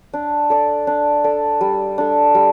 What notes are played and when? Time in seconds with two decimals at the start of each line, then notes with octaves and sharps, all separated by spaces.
0.13 D4
0.50 A4 D5
0.87 D4
1.24 A4 D5
1.61 G3
1.98 D4 A4
2.35 G3